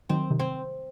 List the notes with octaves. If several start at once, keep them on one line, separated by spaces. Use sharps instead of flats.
D#3 F#3 C4
C3 D#3
C4